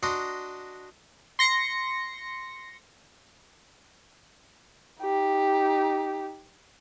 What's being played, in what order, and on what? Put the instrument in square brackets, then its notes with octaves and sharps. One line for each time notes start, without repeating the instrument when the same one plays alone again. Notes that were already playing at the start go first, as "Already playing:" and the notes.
[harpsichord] D4 F#4 D#5 A#5 C6
[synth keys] C6 A#6 C#7
[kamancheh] D#4 G4